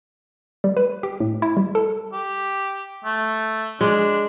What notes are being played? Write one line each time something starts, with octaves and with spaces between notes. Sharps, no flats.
G3
B4
G4
A2
E4
G3
A4
G4
A3
G#3 D4